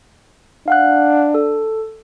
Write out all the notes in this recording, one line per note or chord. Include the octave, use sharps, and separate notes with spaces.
D4 F5 F#5 F#6
A4